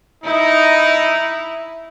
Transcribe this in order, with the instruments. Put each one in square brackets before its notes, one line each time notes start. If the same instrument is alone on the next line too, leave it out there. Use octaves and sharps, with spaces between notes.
[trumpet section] D#4 [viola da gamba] E4